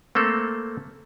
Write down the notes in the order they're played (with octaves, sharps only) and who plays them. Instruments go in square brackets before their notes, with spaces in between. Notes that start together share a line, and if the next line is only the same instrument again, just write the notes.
[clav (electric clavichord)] A3 A#3 C4 A4